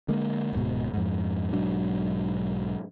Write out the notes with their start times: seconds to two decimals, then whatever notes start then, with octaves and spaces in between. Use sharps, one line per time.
0.08 D3 G#3 A#3
0.53 D1 G#2 B2
0.93 F2 G#2
1.53 B1 G#2 F#3 D4